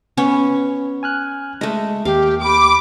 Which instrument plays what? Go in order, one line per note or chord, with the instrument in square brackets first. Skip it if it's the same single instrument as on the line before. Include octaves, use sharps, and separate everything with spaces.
[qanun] B3 C#4 C#5
[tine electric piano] G#5 F6 F#6
[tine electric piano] G#3 [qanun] A3 D#5
[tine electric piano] D#2 [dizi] G4 [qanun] F5
[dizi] B5 [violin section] D6